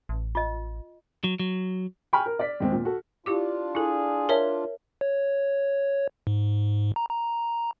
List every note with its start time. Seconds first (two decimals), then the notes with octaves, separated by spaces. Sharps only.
0.09 A1
0.35 F4 D#5
1.24 F#3
1.40 F#3
2.13 G5 G#5 B5 C#6 F6
2.26 A#4
2.39 D5 B6
2.60 D#2 G#2 G#3 C4
2.72 A#2
2.85 F#4 A4
3.26 D4 E4 F4 G4 D6
3.75 E4 G#4 A4
4.29 A#4 C#5 E5 A5
5.01 C#5
6.27 G#2
6.96 A#5
7.09 A#5